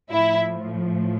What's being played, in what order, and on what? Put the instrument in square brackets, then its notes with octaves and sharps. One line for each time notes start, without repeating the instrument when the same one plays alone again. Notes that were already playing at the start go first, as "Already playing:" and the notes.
[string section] A2 F3 E4 E5